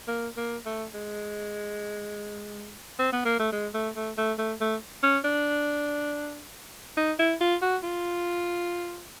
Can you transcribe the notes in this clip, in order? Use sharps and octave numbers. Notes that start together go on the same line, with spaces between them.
A#3
A#3
A3
G#3
C4
B3
A#3
A3
G#3
A3
A3
A3
A3
A3
C#4
D4
D#4
E4
F4
F#4
F4